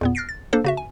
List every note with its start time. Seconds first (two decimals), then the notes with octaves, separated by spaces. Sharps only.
0.01 E2 A#2 B3
0.15 F6 F#6 A6 A#6 C7 D7
0.29 A6
0.53 A#3 D4 A4 C5
0.65 C#3 F#4 E5
0.77 G#5